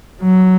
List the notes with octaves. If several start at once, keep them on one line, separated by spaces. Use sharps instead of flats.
F#3